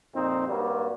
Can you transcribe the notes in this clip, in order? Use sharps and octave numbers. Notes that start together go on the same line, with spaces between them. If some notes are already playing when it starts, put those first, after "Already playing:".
F2 A#2 C4 D#4
G2 F#3 G3 A#3